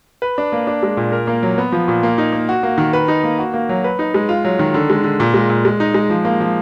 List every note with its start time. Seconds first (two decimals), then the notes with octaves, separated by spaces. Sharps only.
0.22 B4
0.38 D4
0.52 A#3
0.67 D4
0.83 G#3
0.97 A#2
1.12 A#4
1.27 A#3
1.43 F#3
1.58 B3
1.72 F3
1.88 A#2
2.03 A#3
2.18 D#4
2.33 A#3
2.49 F#4
2.63 A#3
2.78 D#3
2.93 B4
3.08 D#4
3.24 A#3
3.39 F#4
3.54 A#3
3.69 F#3
3.84 B4
3.99 D#4
4.14 G#3
4.29 F4
4.45 F#3
4.59 D#3
4.74 D3
4.90 G#3
5.04 D3
5.20 A#2
5.34 G#3
5.49 A#2
5.65 G#3
5.80 D#4
5.94 G#3
6.10 F3
6.25 A#3
6.40 F3